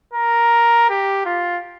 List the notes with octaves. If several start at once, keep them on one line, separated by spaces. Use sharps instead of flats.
A#4
G4
F4